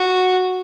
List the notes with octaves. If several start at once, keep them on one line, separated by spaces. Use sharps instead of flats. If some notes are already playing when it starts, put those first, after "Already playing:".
Already playing: F#4